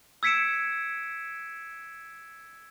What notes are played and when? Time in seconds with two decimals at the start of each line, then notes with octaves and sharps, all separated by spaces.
0.23 E6 G#6 B6 C#7 D7 E7